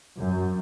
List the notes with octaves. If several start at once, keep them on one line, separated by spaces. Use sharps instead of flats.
F#2